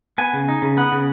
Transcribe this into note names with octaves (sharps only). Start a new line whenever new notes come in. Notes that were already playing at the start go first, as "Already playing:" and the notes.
B3 G#5
C#3
D#4
C#3
B3 F#5
C#3